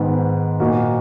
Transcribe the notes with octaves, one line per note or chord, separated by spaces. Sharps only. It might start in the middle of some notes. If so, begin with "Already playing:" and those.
Already playing: G#2 D#3 G#3 B3
A#2 F#3 A#3 D#4 F#4